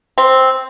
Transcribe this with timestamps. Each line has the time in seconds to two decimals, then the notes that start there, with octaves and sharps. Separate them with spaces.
0.18 C4